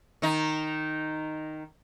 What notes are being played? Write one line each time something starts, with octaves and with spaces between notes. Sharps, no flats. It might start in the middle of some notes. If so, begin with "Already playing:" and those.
D#3 D#4